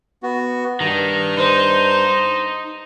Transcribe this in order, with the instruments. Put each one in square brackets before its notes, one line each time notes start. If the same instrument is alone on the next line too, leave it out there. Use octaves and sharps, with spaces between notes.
[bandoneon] B3 F#4
[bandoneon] G2 A#5 [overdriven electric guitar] D#3
[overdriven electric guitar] D#4 [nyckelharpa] C5